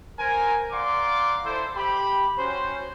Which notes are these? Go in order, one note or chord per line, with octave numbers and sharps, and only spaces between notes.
A#4 C5 G#5
D5 F5 F#5 A#5 C6 D6
E4 A4 C5
G4 B5
C#4 F#4 C5